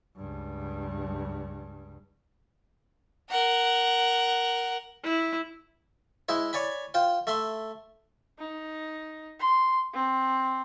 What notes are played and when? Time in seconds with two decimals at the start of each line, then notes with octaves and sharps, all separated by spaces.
0.16 C#2 G2
3.30 A#4 F#5
5.04 E4
6.29 G#3 E4 C5
6.53 C#5 D5 G#5 B5
6.94 F4 C5 G5
7.27 A3 E5 C6
8.39 D#4
9.40 C6
9.93 C4